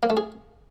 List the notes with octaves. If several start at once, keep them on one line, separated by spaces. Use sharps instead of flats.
A#3
A3
G#4